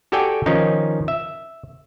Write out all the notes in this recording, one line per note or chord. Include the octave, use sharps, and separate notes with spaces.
F#4 G4 A4 D5 G5 G#5
D#3 F3 C#4 D#4
E5